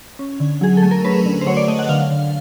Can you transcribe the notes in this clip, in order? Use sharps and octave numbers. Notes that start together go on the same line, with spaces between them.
C#4
D3
F#3 G#4
A4
A3
A#4
C#4 B4
D3
C5
F#3 C#5
D5
A3 D#5
F#5
D3 F5
D3